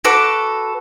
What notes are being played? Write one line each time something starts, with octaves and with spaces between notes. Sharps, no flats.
F#4 A4 B4 D6